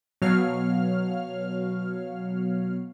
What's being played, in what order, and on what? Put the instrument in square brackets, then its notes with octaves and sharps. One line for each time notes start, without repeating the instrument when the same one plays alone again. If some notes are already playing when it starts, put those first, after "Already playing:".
[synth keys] B2 F#3 C#5 F5 F6